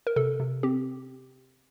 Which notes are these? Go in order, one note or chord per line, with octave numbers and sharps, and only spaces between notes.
A#4
C3 A4
C3
C4 G4